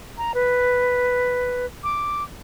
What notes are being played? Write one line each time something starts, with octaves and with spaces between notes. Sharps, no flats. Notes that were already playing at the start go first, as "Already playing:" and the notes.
A#5
B4
D6